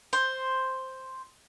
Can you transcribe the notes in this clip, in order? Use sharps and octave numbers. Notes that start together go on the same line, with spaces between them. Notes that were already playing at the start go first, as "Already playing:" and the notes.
C5